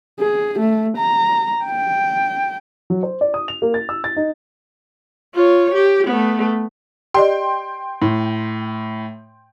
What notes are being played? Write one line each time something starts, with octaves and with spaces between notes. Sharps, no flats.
G#4
A3
A#5
G5
F#3
C5
D5
D#6
F7
A#3
A6
E6
A6
D#4
F4 C#5
G4
A3 B3
G4 D5 D#5 G5 C6
A2